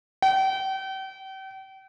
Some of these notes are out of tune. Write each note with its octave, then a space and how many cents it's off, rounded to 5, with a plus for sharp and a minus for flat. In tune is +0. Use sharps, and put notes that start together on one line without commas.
G5 -40